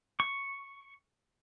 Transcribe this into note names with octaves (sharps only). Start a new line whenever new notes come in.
C#6